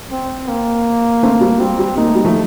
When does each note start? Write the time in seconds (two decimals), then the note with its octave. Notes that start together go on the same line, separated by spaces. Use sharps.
0.11 C4
0.48 A#3
1.23 A3 C4
1.41 G3
1.60 G3 C4
1.79 G3
1.97 A#3 D#4
2.07 A3
2.15 G3
2.24 F3 A3